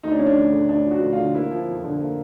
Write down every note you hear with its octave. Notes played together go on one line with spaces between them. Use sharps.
D2 D#4
D4
F3 C#4
D4
D2
D3
D2 D4
F3
F#4
D2
F4
D3
A#3 E4
F3
F2
D3
A#3